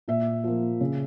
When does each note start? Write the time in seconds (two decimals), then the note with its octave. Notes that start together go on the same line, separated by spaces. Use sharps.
0.08 A#2 E5
0.44 F3 A#3
0.81 C#3